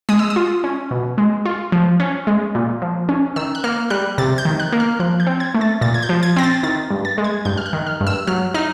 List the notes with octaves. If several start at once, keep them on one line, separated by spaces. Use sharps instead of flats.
G#3 D#6
E6
D#6
F4
C#4
B2
G#3
F4
F3
C#4
G#3
A#2
F3
C#4
D#3 E6
F#6
A#3 F6
G3 F#6
C3 A6
G6
D#3
F#6
A#3
F6
F3 F#6
G6
C4
G#6
A3
A6
A#2 A6
G#6
G6
F3
G#6
C4 A#6
A6
D#3 A6
G2
A6
G#3
G#6
G2 G6
F6
F#6
D#3
F6
G2
E6
F#3 F6
D#4 F6